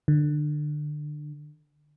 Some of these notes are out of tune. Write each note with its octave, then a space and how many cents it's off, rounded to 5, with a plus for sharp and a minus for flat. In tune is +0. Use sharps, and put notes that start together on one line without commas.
D3 +25